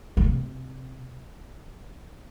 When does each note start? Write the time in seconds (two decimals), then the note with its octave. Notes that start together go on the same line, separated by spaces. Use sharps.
0.17 D3
0.24 C3